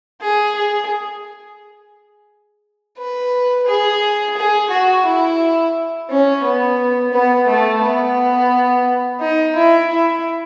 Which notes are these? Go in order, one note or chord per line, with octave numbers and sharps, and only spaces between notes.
G#4
G#4
B4
G#4
G#4
F#4
E4
C#4
B3
B3
A3
B3
D#4
E4
E4